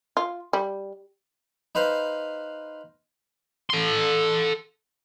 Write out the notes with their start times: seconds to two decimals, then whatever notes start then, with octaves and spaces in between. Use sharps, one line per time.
0.17 F4
0.53 G3
1.75 D#4 B4 C5 F5
3.70 A4 C6